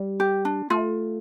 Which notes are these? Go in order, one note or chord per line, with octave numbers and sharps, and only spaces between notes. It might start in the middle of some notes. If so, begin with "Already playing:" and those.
Already playing: G3
G4
D4
A3 F4